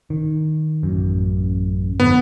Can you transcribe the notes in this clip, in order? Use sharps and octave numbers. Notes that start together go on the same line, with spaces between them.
D#3
A1 F#2
F2 G#2 D3 B3